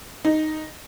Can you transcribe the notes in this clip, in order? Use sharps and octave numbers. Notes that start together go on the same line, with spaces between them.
D#4